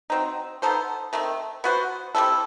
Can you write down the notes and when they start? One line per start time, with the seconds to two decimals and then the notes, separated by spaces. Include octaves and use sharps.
0.10 F#3 C4 D#4
0.62 B3 D#4 A4 C5
1.13 D#3 A3 C4
1.64 B3 F#4 C5
2.15 G3 C4 E4 A4